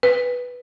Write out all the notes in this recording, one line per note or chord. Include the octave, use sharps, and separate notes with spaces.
B4